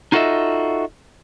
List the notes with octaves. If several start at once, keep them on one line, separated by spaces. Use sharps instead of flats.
D#4 F4 F#4 A4 D#5 E5